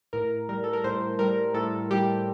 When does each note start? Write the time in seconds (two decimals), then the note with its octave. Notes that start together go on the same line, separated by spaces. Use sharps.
0.13 A2 A#4
0.49 G3 A#4
0.64 A4
0.73 A#4
0.84 A2 C5
1.19 G3 A#4
1.54 A2 A4
1.90 G3 G4